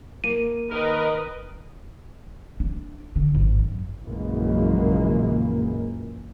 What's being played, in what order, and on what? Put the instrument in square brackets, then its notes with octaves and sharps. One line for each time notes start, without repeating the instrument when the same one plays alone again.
[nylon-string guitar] A#3 [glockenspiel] D#7
[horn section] D#3 A#4 [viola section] B4 D#5
[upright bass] D4
D3
G#1
F#2
[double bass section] A#1 F#2 C#3 E3 G#3 A#3